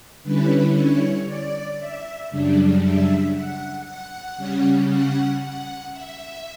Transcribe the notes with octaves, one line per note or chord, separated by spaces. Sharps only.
D3 G3 C#4 E4 B4
C#5
D5
E5
F#2 C#3 G3 D4
E5
F#5
F#5
C#3 G3 C#4
F#5
F#5
E5